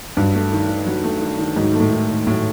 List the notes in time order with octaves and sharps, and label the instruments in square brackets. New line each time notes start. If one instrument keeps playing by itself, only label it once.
[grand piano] G2 [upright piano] F#3
[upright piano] A3
D#3
D#3
F#3
A3
D#3
D#3
[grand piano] G#2 [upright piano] F#3
[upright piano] A3
[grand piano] A2
[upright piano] D#3
D#3
[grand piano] A2 [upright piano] F#3